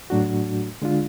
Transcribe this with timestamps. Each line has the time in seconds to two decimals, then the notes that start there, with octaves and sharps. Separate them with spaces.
0.10 A2 F#3 A3 D4 F#4
0.82 D3 G#3 D4 F4